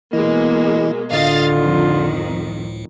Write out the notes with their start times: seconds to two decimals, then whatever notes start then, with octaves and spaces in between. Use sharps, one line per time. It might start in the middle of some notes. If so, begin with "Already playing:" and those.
0.13 B2 E3 G#3 A#3 E4 D#5
1.12 C#2 A2 D3 F4 D#5 F5 A6
1.55 F2 D#3